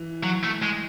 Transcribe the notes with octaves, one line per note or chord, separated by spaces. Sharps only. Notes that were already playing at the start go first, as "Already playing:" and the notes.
Already playing: E3
F#3
A3
G#3